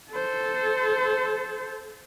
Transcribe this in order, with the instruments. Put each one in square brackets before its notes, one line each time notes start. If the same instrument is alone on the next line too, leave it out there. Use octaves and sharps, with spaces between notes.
[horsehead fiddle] A4 C5